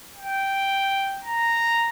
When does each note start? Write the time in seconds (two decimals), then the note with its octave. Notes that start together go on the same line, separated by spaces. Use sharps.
0.16 G5
1.24 A#5